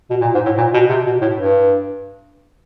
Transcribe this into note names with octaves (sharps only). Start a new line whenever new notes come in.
B2
A#2
G#2
A2
A#2
B2
C3
B2
A2
G2